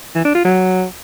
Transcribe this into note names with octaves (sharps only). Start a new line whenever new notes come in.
E3
D4
F4
F#3